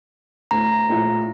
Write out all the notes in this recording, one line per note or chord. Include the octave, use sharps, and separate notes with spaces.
D2 A2 A#5
A#1 A2 F4